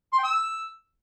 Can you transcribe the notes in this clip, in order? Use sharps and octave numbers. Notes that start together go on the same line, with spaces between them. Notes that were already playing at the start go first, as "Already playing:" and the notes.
C6
G5
E6